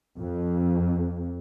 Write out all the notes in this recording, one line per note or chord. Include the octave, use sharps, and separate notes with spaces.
F2